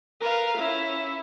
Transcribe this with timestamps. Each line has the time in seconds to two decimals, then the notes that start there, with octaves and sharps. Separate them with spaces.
0.20 A#4 B4 F5
0.58 C#4 E4